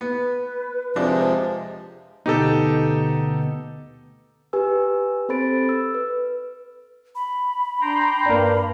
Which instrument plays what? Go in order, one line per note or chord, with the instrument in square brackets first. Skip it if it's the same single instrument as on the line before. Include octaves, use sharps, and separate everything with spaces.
[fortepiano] B3 [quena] B4
[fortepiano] F2 D4 [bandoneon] C3 F3 G#3
[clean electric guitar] D2 B2 B3 [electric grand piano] D#4 G4 A4
[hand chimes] G4 B4 G#5 E6
C4 A4 C5 B5 A6 D7
E6
B4
[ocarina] B5
[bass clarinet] D4 [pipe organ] G5 A#5 C6
[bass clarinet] G2 [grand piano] A#3 D4